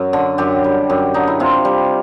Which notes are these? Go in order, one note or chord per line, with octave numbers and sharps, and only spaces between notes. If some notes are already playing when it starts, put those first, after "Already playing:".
Already playing: F#2
D3
F#2 G4
G3
F#2
D3 D#4
E4
C3 F4
G3